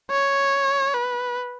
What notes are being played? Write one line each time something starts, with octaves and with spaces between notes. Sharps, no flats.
C#5
B4